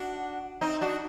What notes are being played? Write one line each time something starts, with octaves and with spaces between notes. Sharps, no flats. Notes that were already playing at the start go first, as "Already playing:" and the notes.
Already playing: D4 F#4
C4 D#4
D4 F#4